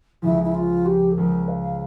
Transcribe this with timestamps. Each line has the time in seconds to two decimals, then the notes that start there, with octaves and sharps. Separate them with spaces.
0.22 C#2 C#3 F3 E4
0.44 E4
0.55 F4
0.86 G4
1.11 A4
1.17 C#2 C#3 F3 A#4
1.48 F5